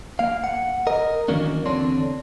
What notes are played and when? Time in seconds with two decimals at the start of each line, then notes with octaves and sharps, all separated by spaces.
0.19 A#3 F5
0.44 F#5
0.87 A#4 D#5
1.28 D#3 E3 F#3 A#3 C#4 D4
1.65 E2 D3 C4 D4 C#5 C6